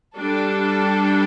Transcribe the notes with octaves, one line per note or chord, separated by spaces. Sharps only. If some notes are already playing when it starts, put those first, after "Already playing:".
G3 D4 A4